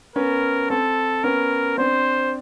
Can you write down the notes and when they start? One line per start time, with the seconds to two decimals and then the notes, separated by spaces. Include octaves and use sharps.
0.16 B3 C#4 A#4
0.70 C4 A4
1.24 B3 C#4 A#4
1.78 C4 D4 C5